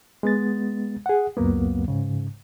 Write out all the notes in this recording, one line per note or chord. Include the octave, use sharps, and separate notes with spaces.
G#3 B3 A6
G#4 F#5
C#2 F#2 F#3 A#3 B3
G#2 C#3